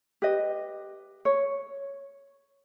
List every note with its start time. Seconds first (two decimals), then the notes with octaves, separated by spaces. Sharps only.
0.22 G4 B4 D#5
1.25 C#5